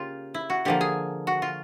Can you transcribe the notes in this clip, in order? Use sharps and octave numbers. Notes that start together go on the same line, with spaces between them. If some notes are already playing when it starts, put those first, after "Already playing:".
Already playing: C#3 A#3 F4 G4
E4
F#4
D3 F3 A#3 G4
G#4
F#4
F4